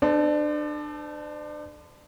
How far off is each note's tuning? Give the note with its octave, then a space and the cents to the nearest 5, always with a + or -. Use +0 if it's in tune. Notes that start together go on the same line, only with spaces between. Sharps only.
D4 +30 A4 -10 C5 -40